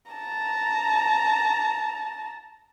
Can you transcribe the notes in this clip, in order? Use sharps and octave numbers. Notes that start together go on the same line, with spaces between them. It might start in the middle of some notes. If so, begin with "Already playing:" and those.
A5 A#5